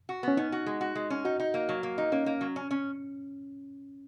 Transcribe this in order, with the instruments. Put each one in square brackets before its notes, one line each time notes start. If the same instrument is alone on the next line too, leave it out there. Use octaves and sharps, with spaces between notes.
[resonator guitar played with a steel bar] F#4
[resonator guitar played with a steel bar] B3 [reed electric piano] C#4
[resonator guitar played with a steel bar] C#4 [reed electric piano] D#4
[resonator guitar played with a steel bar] F#4
G#3
F#4
G#3
C#4
[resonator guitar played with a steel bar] D#4 [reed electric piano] F#4
[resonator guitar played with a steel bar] D#4
A#3
F#3
A#3
D#4
[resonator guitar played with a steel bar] A#3 [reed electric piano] C#4
[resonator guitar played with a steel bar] A#3
F#3
C#4
C#4